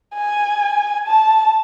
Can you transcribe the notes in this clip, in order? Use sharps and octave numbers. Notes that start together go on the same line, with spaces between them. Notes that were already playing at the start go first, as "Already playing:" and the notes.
G#5
A5